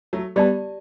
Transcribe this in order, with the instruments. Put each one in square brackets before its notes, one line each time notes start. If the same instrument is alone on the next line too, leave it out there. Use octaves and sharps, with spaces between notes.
[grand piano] F#3 A3
[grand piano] G3 B3 [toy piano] G4 D5 A5